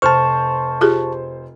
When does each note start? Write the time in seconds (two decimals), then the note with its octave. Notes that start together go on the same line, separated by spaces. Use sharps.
0.02 F1 C5 A5 C#6 F6
0.81 F4 G4 G#4